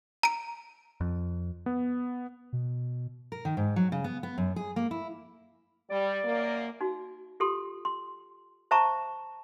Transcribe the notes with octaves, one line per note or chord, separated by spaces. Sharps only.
A#5 D7
F2
B3
B2
A#4
D#3
G#2
F#3
C#3
B3
B3
F#2
G#4
A#3
E4
G3 D5
F#2 A#3
D#4 F#4
F4 G4 A4 C6
C6
C5 E5 A5 A#5 C#6